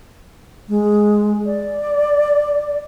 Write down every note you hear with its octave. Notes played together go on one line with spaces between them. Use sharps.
G#3
D5